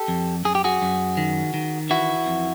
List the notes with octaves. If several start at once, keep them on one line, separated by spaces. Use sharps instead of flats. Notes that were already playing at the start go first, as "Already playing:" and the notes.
Already playing: G4 A4
F2
F#2 G#4
G4
F#4 G#4
F#2
D#3
D#3
E3 E4 F#4
F2